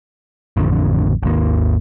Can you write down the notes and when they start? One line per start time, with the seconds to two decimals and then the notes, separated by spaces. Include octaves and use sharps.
0.57 A1 F2 D3
1.23 G#1 D#2 A#3